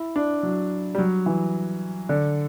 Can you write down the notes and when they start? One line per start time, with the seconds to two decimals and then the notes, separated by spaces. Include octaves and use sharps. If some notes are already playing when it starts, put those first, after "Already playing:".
Already playing: E4
0.16 D4
0.43 F#3
0.95 G3
0.98 F#3
1.26 E3
2.09 D3